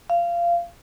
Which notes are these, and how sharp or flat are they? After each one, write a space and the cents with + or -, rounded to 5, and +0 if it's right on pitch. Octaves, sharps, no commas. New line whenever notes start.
F5 -20